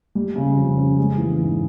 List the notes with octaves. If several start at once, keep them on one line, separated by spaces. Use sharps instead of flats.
G3
C#3
F2
C#4
G#3
E3
G#2